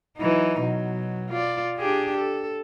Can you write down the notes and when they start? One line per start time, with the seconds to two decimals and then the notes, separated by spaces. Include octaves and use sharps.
0.17 E3 F#3 D#4
0.61 B2 F#3
1.29 F4 D5
1.77 D4 G4 G#4
2.17 A4